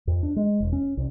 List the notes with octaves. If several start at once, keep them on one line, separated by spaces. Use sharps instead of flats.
F2
D4
G#3
E1
C#4
C2